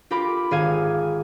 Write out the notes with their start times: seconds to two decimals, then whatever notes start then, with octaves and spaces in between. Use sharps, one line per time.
0.11 F4 G4 A#4 B5 D6
0.51 G#1 G#4 F5 G#5 G#6